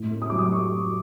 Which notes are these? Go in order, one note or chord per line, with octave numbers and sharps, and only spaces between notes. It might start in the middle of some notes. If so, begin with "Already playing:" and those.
Already playing: A2
A3
D#6
F#3 D6
D#6
A3 C#6